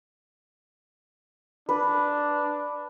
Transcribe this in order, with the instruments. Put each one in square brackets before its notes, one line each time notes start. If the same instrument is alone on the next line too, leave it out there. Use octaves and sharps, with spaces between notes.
[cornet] D4 [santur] B4